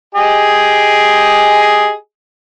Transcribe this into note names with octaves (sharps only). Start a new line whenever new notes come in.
G4 G#4 D#5